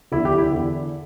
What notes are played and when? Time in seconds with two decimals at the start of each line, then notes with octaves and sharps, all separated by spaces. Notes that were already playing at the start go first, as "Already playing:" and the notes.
0.12 E2 D3 E4
0.25 G4
0.38 E4
0.52 E2 D3